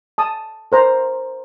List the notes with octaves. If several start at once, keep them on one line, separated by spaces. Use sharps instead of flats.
A5 D#6
A#4 C5 A#5